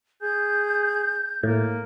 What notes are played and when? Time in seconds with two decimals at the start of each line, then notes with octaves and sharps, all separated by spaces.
0.22 G#4 G6
1.43 A2 A#3